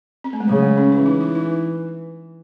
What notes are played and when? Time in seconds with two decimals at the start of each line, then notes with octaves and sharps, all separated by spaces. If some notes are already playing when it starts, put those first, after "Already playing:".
0.24 C4
0.33 A3
0.40 G#3
0.48 C#3 F#3
0.62 G#3
0.77 C#4
0.92 E3 C#4
1.06 D#4
1.21 E4
1.35 D#4